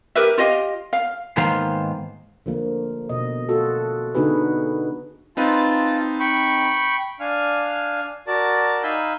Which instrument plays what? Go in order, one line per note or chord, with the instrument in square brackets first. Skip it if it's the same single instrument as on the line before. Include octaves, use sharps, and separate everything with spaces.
[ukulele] G4 A#4 B4 E5
F4 G4 D#5 F5
F5
[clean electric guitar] G#2 D#3 A#3 B3 C5 F5
[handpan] D3 F3 A#3
B2 D#5
F4 F#4 A4
D3 B3 D#4 F#4 G#4 B4
[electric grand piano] C4 D#4 B4 [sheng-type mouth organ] F4 A5
[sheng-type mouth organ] G5 B5 C#6
D4 F5 G#5 F6
F#4 A#4 D5 A5
D#4 F5 G#5 B5 E6 G6